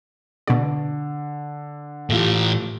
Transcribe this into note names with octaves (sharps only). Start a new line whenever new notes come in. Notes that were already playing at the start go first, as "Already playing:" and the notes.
B2 D3 D5
A2 E3 A3 F4 G4